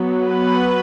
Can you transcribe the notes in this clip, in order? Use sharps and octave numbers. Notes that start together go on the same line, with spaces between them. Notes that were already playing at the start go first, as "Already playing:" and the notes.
Already playing: F#3 B3
B4